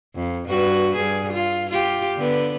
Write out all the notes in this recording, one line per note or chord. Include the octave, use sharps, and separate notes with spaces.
F2
G2 F#4 B4
G2 G#4
F4
F4 G4
D3 B3 B4